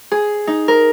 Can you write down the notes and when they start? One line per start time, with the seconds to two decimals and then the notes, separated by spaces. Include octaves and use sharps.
0.11 G#4
0.47 D#4
0.68 A#4